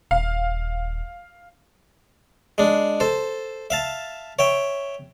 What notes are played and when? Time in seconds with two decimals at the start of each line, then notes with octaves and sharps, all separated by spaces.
0.11 D#1 F5
2.58 G#3 D4
3.00 A4 C5
3.70 E5 F5 A5
4.39 C#5 E5 G5